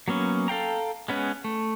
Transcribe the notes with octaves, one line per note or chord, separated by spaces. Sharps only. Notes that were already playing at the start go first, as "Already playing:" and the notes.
F#3 A#3 B3 C#4
A4 F5 G5 A#5
G#3 B3 C#4 B4
A3